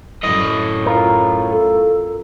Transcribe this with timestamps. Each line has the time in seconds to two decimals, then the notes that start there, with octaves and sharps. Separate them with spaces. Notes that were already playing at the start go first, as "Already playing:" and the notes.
0.23 F#2 A2 D#5
0.86 F4 A#4
1.50 A4